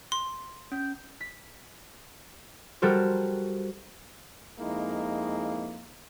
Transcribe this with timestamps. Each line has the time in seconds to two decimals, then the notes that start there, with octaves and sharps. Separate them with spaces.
0.12 C6
0.72 C#4 G6
1.21 B6
2.82 G3 F#4 A4 A#4 C5
4.59 F2 G#3 A#3 D#4 E4